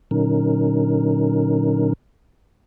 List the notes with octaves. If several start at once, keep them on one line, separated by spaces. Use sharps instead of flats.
A#2 D3 F#3 C#4 D#4 A#4